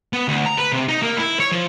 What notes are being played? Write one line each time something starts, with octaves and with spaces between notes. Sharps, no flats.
B3
D2
A#5
B4
C3
D#4
A#3
E4
C#5
F3